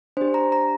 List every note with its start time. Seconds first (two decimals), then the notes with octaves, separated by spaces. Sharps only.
0.17 D4 C5
0.21 G4
0.34 A#5
0.52 A#5